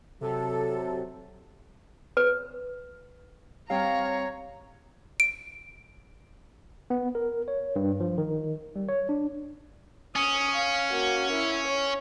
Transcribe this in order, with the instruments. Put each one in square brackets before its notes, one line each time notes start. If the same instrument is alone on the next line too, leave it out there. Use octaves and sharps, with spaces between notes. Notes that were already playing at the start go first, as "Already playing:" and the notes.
[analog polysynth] C3 [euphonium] F#3 [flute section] A4
[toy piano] B4
[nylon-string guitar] G3 C4 G5 [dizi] C#5 [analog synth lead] F5 [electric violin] A#5
[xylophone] D7
[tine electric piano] B3
A#4
C#5
G2
F3
D#3
G3
C#5
D4
[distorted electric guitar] C#4 [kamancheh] D#6
[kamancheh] F5
A#3 F#4
E4
C#5